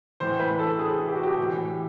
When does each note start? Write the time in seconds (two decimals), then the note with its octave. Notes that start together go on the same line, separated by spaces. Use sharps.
0.20 A2 E3 C5
0.40 B4
0.59 A4
0.79 G#4
1.08 G4
1.15 F#4
1.23 G4
1.37 A2 E3